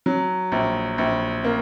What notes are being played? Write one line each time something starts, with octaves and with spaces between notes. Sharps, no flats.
F#3
A#1
A#1
A#3